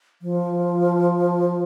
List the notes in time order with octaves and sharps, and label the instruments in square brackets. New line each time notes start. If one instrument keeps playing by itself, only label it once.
[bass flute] F3